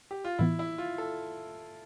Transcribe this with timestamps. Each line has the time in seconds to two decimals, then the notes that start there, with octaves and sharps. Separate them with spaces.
0.11 G4
0.24 F4
0.39 A2 E3 B3 E4
0.59 E4
0.78 F4
0.98 A4